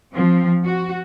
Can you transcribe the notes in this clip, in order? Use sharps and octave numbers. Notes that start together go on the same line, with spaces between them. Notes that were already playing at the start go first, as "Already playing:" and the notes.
F3 C4
F#4